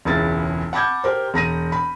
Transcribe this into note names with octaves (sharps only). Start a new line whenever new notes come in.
E1 C#2 C#3 E4 A6
F#5 A5 B5 D6 G6 G#6
G4 A#4 C5
E1 A#5 A#6 D#7
B5